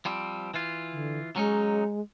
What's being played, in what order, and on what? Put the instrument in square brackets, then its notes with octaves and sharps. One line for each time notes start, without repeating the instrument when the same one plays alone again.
[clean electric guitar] F3 G3 C4
E3 F4
[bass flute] D3
[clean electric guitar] F#3 C#4 D#4 [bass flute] G#3